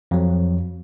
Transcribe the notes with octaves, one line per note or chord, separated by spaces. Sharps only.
F2 F#3